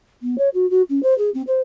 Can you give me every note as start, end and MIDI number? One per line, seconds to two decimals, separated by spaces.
0.22 0.38 59
0.38 0.49 73
0.54 0.68 66
0.70 0.82 66
0.89 1.02 61
1.03 1.16 72
1.18 1.30 68
1.34 1.42 60
1.47 1.60 72